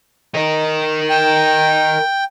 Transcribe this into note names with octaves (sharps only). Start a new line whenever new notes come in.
A#4 D#5
G5